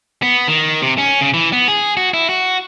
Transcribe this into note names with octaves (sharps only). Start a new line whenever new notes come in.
B3
D#3
C3
C#4
C#3
E3
B3
G#4
F#4
E4
F#4